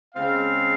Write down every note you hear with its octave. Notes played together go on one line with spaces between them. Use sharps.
C#3 G#3 C4 F5